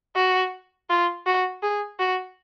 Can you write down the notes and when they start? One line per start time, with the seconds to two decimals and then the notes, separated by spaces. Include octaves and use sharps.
0.16 F#4
0.90 F4
1.26 F#4
1.63 G#4
1.99 F#4